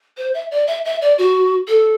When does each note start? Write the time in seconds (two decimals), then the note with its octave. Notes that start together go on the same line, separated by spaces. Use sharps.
0.17 C5
0.34 E5
0.51 D5
0.67 E5
0.85 E5
1.01 D5
1.18 F#4
1.68 A4